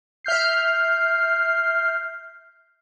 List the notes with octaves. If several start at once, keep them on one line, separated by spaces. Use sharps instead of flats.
E5 F6 G6 C7